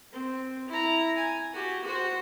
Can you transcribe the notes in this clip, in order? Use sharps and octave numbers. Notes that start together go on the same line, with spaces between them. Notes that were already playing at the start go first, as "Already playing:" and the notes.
C4
E4 A#5
G#5
F#4 G4
F#4 C5